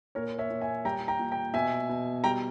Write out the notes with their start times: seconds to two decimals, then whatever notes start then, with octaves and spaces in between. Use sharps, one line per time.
0.15 A#2 A#4 C#5
0.39 C#5 E5
0.50 A#2
0.61 E5 G#5
0.85 G3 G5 A#5
1.08 G5 A#5
1.19 A#2
1.32 G5 A#5
1.54 B2 E5 G#5
1.89 B2
2.24 G3 G5 A#5